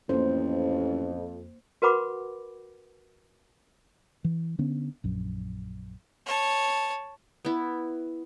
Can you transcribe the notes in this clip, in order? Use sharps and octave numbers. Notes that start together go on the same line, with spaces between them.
A1 F2 A#3 C5
F#4 A#4 B4 F#5 B5 D6
E3
D3 B3 C#4
A#1 F#2
C#5 A5
B3 E4